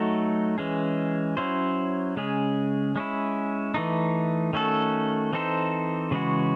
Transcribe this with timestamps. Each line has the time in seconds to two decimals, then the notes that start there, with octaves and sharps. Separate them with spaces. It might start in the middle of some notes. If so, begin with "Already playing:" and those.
Already playing: F#3 A3 D#4 F#4 A4
0.58 E3 G#3 C#4 G#4
1.37 F#3 C#4 E4 C5
2.17 C#3 G#3 C#4 G#4
2.96 G#3 C#4 E4
3.74 E3 A3 D#4
4.53 D#3 A3 C#4 F#4 A4
5.33 E3 C4 D#4 A4 C5
6.11 C#3 E3 G#3 C#4 F#4